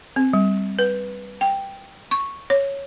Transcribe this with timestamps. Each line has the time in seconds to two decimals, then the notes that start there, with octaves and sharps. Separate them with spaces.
0.16 C4
0.33 G3
0.79 B4
1.41 G5
2.11 C#6
2.50 C#5